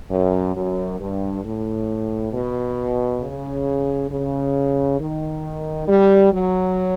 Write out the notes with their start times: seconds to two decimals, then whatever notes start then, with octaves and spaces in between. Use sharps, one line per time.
0.10 F#2
0.55 F#2
1.00 G2
1.44 A2
2.33 B2
3.21 C#3
4.10 C#3
4.99 D#3
5.88 G3
6.33 F#3